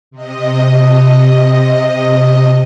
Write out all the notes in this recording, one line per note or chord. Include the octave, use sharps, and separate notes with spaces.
C3 D#5